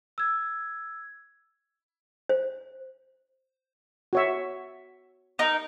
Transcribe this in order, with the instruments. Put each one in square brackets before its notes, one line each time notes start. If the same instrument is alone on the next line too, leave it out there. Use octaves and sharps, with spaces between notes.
[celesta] E6 G#6
[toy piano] C5
[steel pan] F#4 C#5 E5
[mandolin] D#4 A#4